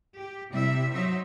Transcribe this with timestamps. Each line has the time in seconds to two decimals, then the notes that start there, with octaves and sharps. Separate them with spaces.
0.17 G4
0.52 C3 G3 E4 E5
0.93 F#3 D#4 C5 E5